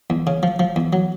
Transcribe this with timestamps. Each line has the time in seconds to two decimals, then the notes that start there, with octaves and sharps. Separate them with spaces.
0.10 E2
0.27 C#3
0.43 F3
0.59 F3
0.76 E2
0.93 F#3